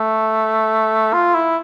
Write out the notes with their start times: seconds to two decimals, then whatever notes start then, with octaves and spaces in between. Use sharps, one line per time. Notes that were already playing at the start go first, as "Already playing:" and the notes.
Already playing: A3
1.14 F4
1.35 E4